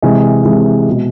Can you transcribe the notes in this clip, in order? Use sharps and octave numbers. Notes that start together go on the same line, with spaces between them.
C3 E3 G#3
C3 E3 G#3
B2 G#3